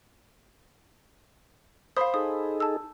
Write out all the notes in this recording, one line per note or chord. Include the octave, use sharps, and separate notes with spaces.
C5 F5 B5 D#6
D#4 G#4 A4 D#6
A5 E6